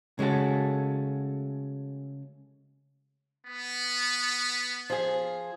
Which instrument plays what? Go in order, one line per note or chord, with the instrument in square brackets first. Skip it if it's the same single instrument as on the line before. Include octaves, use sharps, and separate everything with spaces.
[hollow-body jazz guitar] C#3 G#3 A3 F#4 A4
[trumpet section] B3
[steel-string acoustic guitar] F3 G#4